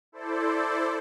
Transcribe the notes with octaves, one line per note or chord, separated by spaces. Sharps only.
E4 A4 C5 D5